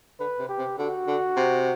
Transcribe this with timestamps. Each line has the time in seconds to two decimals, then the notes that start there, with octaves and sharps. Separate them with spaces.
0.20 D3 B4
0.39 C3
0.49 G4
0.58 C3
0.78 D3 F#4
1.07 D3
1.36 C3